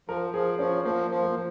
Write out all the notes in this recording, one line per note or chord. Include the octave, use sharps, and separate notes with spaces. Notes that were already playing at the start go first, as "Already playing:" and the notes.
F3 A#4
F3 G#4
F3 C#4
F3 A#3
F3
A#3